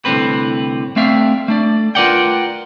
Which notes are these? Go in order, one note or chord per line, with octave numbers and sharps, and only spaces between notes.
C2 A2 D3 C4 B4
A3 C4 D4 E5 F5
A3 D4 D5
F4 A#4 B4 D5 F#5 G5